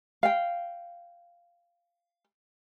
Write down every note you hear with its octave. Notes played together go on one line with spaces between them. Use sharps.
F5 G5